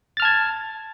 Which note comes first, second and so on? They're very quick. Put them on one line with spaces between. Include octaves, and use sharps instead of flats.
A6 F6 A5 G#6